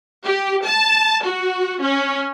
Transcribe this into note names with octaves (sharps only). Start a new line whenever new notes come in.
G4
A5
F#4
C#4